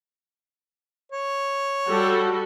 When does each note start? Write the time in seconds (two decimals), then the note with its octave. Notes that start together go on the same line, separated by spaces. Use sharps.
1.12 C#5
1.88 G3 F#4 A4